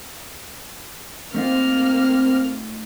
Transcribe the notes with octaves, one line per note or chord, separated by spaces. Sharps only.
A3 A#3 C4 D#4 F4 F6